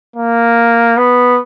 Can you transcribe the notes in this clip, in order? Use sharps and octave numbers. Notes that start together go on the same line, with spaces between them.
A#3
B3